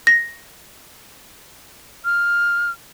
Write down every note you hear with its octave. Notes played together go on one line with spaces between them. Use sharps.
A#6
F6